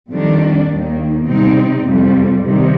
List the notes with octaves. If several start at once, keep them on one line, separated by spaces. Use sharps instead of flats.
F2 D#3 G3 D4
D#2 D#3 A#3
C3 G3 C4 D#4
F2 C3 G3
C3 D#3 G3